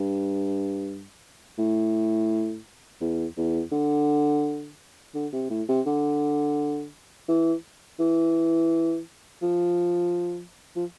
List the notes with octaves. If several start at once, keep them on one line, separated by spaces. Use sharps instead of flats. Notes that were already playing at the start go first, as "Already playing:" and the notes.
Already playing: G2
A2
E2
E2
D3
D3
C3
A2
C3
D3
E3
E3
F3
F3